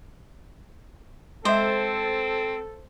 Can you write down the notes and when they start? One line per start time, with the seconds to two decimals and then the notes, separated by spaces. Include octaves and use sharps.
1.45 G#3 C4 A4 C5 E5